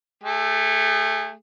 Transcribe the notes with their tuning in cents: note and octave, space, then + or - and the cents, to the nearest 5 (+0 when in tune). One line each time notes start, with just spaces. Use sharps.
A3 +0 G#4 -35